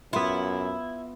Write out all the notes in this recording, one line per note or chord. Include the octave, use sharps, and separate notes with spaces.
F#2 B3 E4 F4